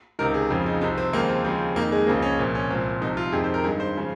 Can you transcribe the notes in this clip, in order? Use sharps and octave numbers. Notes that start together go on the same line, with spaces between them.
C#2 C3 D#3 A#4
G#4
F2 C#3 F3
D#4
C2 C3 F3 D#4
C4
D#2 C#3 F3 A#3
C4
D#2 C#3 F3 C4
F2 D#3 A#3
G#3
C#2 C#3 F3 A#3
C#4
C2 A#2 F3
C#4
C2 A#2 F3 C4
C2 C3 F3 D#4
F4
F2 C3 D#3 G#4
C5
A#4
G2 D#3 G#4
C5
C#3 F3